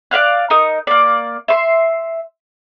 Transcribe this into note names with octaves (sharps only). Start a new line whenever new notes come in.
D5 E5 F5 F#6
D#4 A#4 D#6
A#3 D5
E5 C6